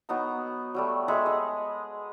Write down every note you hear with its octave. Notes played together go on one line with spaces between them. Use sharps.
F#3 B3 D#4 A#5
F#3 G3 A3
G#3 A4 E5 B5
G#4 D#5